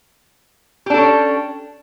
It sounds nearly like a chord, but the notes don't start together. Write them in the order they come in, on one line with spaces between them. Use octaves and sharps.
G4 D4 A4 C#4